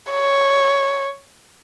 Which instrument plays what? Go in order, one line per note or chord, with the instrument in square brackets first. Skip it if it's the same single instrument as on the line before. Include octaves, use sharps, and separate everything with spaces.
[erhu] C#5